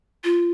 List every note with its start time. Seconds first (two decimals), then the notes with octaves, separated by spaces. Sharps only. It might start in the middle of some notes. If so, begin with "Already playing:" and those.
0.24 F4